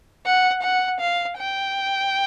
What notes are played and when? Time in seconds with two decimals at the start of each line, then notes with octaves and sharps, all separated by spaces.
0.26 F#5
0.63 F#5
1.00 F5
1.37 G5